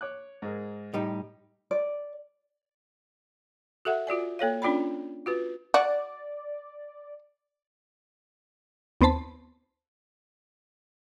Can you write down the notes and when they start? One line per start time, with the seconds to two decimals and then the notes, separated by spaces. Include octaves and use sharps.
0.01 C#5 D6 F#6
0.42 G#2 G#4 A#4
0.93 A2 G3 D#4 D#5
1.71 D5
3.85 F#4 A4 E5 F#5
4.07 F4 F#4 D5 G#5
4.39 A#3 A4 C#5 F5
4.62 C#4 D4 F4 D5 G5 B5
5.26 F4 F#4 B4
5.74 F#4 D5
9.01 D#2 B3 C4 C5 A5 B5